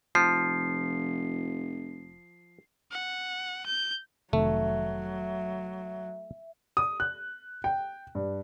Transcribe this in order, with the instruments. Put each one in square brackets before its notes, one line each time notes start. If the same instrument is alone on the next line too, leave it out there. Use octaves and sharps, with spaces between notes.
[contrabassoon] F1 [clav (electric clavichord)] F3 [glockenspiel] C7
[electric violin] F#5
G6
[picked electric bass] F1 C3 D#3 [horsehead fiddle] F#3 [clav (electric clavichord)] A3 [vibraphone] E5
[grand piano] D#6
F#6
G5
G2